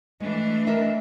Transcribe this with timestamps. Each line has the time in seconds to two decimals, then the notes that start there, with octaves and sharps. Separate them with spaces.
0.20 E3 G#3 A3 D4
0.67 A#4 D#5 E5